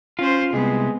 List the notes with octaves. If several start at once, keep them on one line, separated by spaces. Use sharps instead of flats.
C#4 F4 C5
C2 G#3 B3 C4